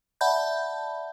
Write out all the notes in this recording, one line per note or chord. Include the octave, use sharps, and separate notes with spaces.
D5 E5 F#5 A5 B5 G6